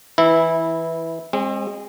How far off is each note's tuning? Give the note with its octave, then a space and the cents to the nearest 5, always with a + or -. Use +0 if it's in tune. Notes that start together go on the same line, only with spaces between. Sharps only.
E3 +0 E4 -15
G#3 -25 C4 +30